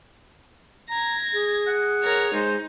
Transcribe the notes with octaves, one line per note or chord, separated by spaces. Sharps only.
A#5 G#6 A#6
G#4
F#5
A#4 C#5
G#3 D#4 C5